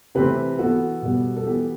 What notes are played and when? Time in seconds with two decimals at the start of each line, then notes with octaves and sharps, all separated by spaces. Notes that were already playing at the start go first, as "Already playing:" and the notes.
0.15 C3 E3 A3 C4 G4 B4
0.59 E3 B3 F#4 A4
1.02 B2 G3 B3
1.36 A4
1.47 E3 B3 G4